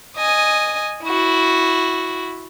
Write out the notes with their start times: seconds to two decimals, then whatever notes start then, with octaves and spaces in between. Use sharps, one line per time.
0.17 D#5 G#5
1.04 E4 F#4